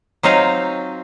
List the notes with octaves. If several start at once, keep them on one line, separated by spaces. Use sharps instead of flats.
F#3 C4 D#4 F4 D#5 F5